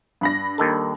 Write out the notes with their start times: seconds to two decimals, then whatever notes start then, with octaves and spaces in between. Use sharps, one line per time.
0.21 G2 B5 A#6
0.58 D#2 D#3 A4